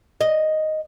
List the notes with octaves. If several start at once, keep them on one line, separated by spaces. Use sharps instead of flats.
D#5